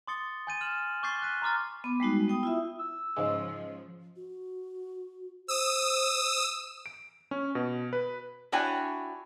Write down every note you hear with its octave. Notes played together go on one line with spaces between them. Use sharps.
C6 D6 D#6 A6 C#7 G7
G#5 C6 G6 A6 D#7
F6 E7 F#7
C#6 D6 G6 A6 C7 G7
F#6 B6 D#7
A#5 C6 D6 F6 A6
B3 D6
G3 G#3 D#4 F#4
B3 G5 D#6
E4 F4 E5
E6
G#2 C#3 F3 G#3
F#4
C5 D#6 E6
D7
C#4
B2
B4
D4 E4 F#4 C#5 G5 G#5